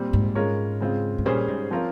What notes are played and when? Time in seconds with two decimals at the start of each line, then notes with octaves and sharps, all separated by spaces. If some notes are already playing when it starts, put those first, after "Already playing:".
Already playing: A#2 G3 C4
0.13 G#2
0.35 G#3 C#4 F4 A#4 C#5
0.81 C#3 G#3 C4 F4
1.18 G#2
1.25 A#2 G3 C#4 G#4 C5
1.48 G#2
1.71 F3 C4 F4 A#4 C#5